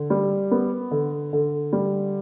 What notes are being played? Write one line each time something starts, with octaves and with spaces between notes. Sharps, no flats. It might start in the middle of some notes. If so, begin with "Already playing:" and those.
Already playing: D3
G3
B3
D3
D3
G3